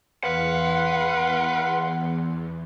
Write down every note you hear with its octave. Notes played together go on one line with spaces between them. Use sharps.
E2 B4 F5 F#5 C6